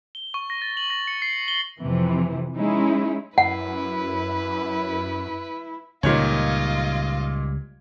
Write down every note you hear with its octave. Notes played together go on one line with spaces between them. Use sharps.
G7
C#6
A#6
A6
F#7
A#6
C#7
C7
C#7
G7
F2 C3 E3
G#3 C#4 D#4 E4
F#2 E4 B4 F#5
C#2 A#2 D#3 G3 F4 C#5 D#5